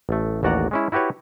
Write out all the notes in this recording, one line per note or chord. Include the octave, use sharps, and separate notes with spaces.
A1 A3
A1 D#2 F#4 D5 F#5 A#5
G#3 C#4 E4
E4 F#4 G4 B4 C#5